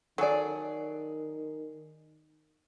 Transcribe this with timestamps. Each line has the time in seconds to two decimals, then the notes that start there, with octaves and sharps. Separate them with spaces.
0.18 D#3 F#3 G#4 A4 D5